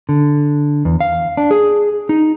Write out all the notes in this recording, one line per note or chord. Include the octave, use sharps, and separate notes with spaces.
D3
E2
F5
D4
G#4
D#4